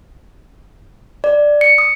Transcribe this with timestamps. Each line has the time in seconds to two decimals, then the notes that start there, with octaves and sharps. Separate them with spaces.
1.24 D5
1.61 C#7
1.78 D#6